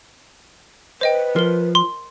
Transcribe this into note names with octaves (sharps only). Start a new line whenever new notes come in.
B4 C5 D#5 G5
F3 A#4 G7
C6